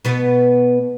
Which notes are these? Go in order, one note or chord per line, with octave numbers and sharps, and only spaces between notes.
B2 B3 B4